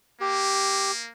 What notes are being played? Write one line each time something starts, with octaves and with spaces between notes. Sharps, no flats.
A#3 G4